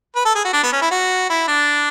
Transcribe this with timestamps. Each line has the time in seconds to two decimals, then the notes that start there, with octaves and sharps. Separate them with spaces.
0.16 B4
0.25 A4
0.35 G#4
0.45 F#4
0.53 D4
0.63 B3
0.72 C#4
0.82 E4
0.91 F#4
1.30 E4
1.48 D4